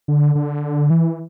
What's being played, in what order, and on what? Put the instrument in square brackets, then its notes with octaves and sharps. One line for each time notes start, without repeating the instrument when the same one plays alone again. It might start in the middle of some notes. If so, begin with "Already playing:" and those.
[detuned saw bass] D3
D3
E3